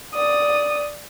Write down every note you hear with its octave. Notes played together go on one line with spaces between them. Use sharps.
D5 D#6